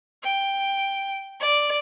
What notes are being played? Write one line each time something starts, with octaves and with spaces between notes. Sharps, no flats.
G5
D5